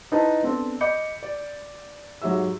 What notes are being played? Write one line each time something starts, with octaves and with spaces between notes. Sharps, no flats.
D#4 E4 B4 C5 A5
B3 C4 D4 A4
D#5 B5 D6 G6 C#7
D5
G#2 F#3 G4 E5 E6